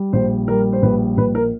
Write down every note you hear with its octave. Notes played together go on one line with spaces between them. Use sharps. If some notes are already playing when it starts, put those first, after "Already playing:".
Already playing: G3
A#1 C5
G3 A#4
C5
A#1 B4
A#1 B4
A#4